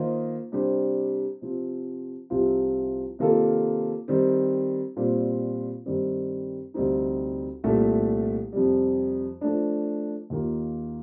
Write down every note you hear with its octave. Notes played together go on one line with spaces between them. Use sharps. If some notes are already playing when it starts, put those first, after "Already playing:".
Already playing: D#3 A#3 F4 C5 D#5
C3 G3 D4 G4 C5
C3 F3 C4
C2 C3 F3 C4 F4
C3 D#3 A#3 F4 A4
D#3 G3 C4
A#2 G3 C4 F4
G2 D#3 G3 C4
D2 C3 G3 C4 D#4
C2 A#2 A3
F2 C3 G3
F3 A3 D4
D#2 D#3 A#3 F4